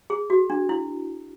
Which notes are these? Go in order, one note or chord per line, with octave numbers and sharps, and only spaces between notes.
G#4
F#4
D4
E4